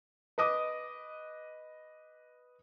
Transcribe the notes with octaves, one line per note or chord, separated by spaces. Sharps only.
B4 D#5 D6 D#6